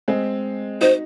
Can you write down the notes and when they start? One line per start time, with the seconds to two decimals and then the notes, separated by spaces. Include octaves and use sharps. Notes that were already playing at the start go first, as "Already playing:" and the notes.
0.08 G#3 C4
0.81 D#4 F#4 C5